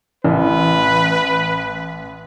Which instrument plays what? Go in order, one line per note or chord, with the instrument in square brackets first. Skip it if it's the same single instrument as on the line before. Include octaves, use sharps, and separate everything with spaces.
[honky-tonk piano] A1 [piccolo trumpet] B4